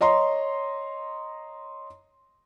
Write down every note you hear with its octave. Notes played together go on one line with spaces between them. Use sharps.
C#5 D#5 A#5 C6